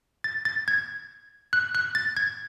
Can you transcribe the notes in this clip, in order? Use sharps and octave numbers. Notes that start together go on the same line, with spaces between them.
A6
A6
G#6
F#6
F#6
A6
G#6